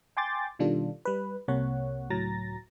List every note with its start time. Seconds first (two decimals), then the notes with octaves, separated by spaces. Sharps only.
0.17 G5 G#5 C6 D6 G6 A6
0.59 B2 D#3 G3 D4 F4 A4
1.05 G3 B4
1.48 C2 C3 A#3 C#5 F#5
2.10 C#2 A2 F#3 A#5 A6 A#6